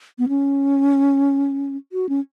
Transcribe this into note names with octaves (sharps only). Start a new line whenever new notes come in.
B3
C#4
F#4
C#4